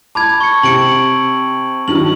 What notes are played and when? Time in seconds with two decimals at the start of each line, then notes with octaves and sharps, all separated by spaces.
0.15 A5 B5 D6 G#6
0.41 C#6 C#7
0.63 C3 C#7 D7 F#7
1.88 G2 D#3 F#3 F#7